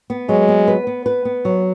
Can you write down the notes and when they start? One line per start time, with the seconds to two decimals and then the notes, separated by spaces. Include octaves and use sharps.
0.10 B3
0.29 F#3 G#3
0.48 B3
0.68 B4
0.87 B3
1.06 B4
1.25 B3
1.45 F#3